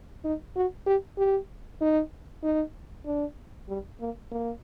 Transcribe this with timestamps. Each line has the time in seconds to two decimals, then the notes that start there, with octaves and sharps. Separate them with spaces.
0.24 D#4
0.56 F#4
0.86 G4
1.18 G4
1.81 D#4
2.43 D#4
3.06 D4
3.68 G3
4.00 A#3
4.32 A#3